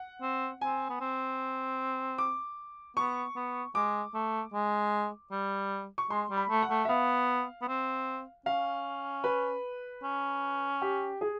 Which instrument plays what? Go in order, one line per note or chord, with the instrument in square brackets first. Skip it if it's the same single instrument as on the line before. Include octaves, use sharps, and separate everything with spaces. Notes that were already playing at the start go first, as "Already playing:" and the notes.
Already playing: [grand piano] F#5
[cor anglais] C4
[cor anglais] C4 [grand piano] G#5
[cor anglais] B3
C4
[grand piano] D6
[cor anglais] B3 [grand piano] C#6
[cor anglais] B3
[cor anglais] G#3 [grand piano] D6
[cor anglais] A3
G#3
G3
[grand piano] C#6
[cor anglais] G#3 [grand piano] C6
[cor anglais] G3
[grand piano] B5
[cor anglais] A3
[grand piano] F#5
[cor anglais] A3
[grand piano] E5
[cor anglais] B3 [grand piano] F5
[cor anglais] B3
C4
[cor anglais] C#4 [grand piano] F5
[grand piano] B4
[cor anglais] C#4
[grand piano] G4
G#4